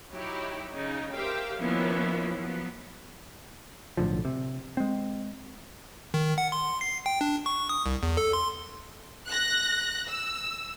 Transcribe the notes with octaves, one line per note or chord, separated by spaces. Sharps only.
F#3 D#4 E4 G4
C#3 D#4
G4 A#4 C5 E5 F5 G5
D#3 F3 A#3 B3 C#4 E4
F3 F#3 B3
B1 A2 D3 F3
C3
G#3 C4
D#3
F#5
C6
C7
G5
D4
C#6
D#6
C2
E2
A4
C6
F#6 A#6
E6